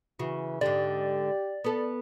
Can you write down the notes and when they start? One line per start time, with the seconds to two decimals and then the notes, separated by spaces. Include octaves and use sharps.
0.19 C#3 E3 F#4
0.61 G#2 D3 G4 D5
1.64 B3 A4